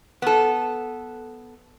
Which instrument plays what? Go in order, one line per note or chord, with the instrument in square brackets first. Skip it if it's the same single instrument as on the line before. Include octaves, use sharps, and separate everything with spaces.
[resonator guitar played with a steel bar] B3 A4